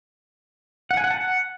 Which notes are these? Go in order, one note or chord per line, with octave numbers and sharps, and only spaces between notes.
F#5
G#5
F#5
A5
F#5